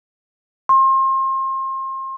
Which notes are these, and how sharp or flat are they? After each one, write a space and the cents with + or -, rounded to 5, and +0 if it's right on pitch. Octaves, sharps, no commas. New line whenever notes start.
C6 +35